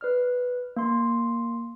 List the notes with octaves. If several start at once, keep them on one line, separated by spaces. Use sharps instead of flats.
B4 D5 F6
A#3 C6